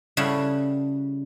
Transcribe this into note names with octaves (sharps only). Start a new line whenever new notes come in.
C#3 G3 E4 A4 F#5